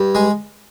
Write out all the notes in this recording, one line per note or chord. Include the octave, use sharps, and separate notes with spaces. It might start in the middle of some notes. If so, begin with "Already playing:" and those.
Already playing: G2
G#3 G#4